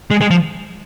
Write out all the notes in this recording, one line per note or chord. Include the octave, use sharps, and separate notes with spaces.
G#3
G#3
F3